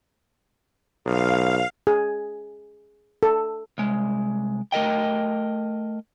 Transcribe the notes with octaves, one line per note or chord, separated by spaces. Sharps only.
B1 F5
G#4
A4
C2 G#3
A3 A#4 D#5 G5